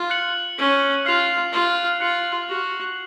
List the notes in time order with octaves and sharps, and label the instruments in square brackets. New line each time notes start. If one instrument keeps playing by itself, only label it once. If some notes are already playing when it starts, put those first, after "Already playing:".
Already playing: [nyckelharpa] F4
[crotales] F#6 C#7 F#7
[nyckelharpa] C#4
[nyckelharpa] F4 [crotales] F6 C7 F7
[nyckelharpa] F4
[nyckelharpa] F4 [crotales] F#6 C#7 F#7
[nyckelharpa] F#4